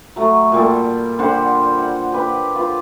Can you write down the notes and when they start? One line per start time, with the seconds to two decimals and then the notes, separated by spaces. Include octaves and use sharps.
0.16 F#3 A3
0.52 A#2 G3 A4
1.19 D3 G3 C5 F#5
1.78 F#5
2.12 G4 B4
2.55 F4 B4